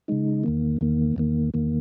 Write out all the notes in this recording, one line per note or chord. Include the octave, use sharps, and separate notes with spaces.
C#3 G#3 D#4
E2 D#3 A#3
E2 D#3 A#3
E2 D#3 A#3
E2 D#3 A#3